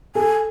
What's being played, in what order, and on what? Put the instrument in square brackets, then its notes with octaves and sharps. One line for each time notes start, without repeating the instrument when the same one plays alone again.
[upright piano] A4 [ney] G#5